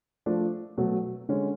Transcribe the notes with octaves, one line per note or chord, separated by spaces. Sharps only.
F3 A3 D4
B2 F#3 A3
D3 G#3 C#4